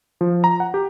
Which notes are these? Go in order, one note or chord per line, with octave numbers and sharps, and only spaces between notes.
F3
A#5
F#5
G4